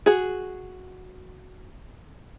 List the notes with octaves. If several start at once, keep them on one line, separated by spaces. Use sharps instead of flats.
F#4 G#4